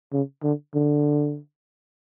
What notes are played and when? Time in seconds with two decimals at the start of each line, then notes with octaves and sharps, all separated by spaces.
0.12 C#3
0.43 D3
0.74 D3